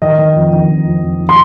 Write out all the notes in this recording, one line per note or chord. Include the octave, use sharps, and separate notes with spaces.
D#3 D#5
D#3
F2
D#3
F2
F2
F2
D#3
C6